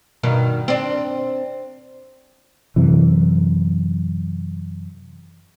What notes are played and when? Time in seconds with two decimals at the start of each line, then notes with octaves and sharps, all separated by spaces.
0.23 G2 B2 D#3
0.68 C4 D4
2.76 F#2 C3 E3